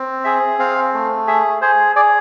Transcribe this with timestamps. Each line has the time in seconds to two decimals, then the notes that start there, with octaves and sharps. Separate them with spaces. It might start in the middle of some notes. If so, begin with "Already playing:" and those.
Already playing: C4
0.24 G#4 E5
0.59 C4 F5
0.94 A3
1.27 G#4 E5
1.61 G#4 C5
1.96 G#4 D5